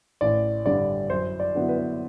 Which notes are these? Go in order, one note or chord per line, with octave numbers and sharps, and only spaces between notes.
A1 D5
G2 D3 G3 D5
F#2 C5
D5
D3 F#3 B3 E4
B4